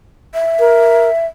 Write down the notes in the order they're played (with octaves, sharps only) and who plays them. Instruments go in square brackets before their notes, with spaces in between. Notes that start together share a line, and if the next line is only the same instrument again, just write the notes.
[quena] E5
[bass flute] A#4